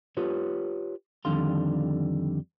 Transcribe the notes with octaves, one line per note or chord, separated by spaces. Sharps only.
F4 G4 B4 C#5
F2 D3 D#3 G3 F5 C6